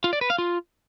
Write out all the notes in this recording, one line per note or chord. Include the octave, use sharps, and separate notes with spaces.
F4
D5
B4
F5
F4